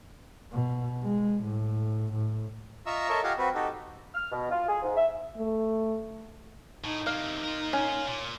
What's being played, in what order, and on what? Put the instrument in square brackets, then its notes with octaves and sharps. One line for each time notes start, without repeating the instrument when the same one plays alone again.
[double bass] B2
G#3
A2
A2
[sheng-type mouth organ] F4 D#5 E5 A#5 C#6 E6
A4 A#4 C#5 D#5 E5
F4 G4 D#5 F5 F#5 G#5
C4 F#4 B4
D#4 F#4 G4 A4
[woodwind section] F6
B2
F4
G#4
G#2
E5
[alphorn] A3
[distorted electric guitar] A2 [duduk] D#4
[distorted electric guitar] C3 A#3 [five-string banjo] F5
[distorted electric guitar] F4 A#4
[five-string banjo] C#4
[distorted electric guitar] A#2